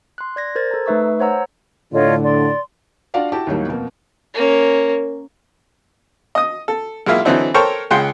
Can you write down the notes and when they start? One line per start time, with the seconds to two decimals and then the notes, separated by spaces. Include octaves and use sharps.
0.18 C6 F#6
0.36 D5 G#6 A#6
0.55 A#4 C5 G#6 A6
0.71 A4 A#5
0.86 A3 D#4 B4 E5 C#6 E6
1.19 C5 C#5 F#5 A#5 E6
1.93 A2 D3 F4 C#5 D#5
2.22 D5 C6
3.14 D4 F4 F#4 D5 F5 F#5
3.32 E4 F#4 G4 A5
3.47 D#2 A2 D#3 F#3 G3 A#3
3.68 F2 B2 A#3
4.35 A#3 C#4
6.35 D#5 D#6
6.68 A4
7.06 B1 G#3 A#3 E4 F4 E5
7.25 D3 E3 F#3 C4 D#4 E4
7.54 A4 A#4 C5 C#5 G5 C#6
7.91 C#2 G#3 F#5 G5 C6